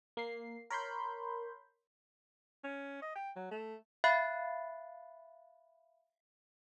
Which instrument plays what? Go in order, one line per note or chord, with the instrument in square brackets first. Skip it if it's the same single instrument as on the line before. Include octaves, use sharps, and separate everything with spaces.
[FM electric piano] A#3 C7
A#4 C#5 B5 C6 G6
[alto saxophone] C#4
D#5
G5
F#3
A3
[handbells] E5 F5 B5 F#6 A6 C7